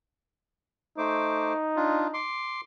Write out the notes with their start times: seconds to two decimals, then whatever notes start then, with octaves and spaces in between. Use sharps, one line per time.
0.98 A3 D#4 C5 D6
1.76 D4 F4
2.14 C6 D6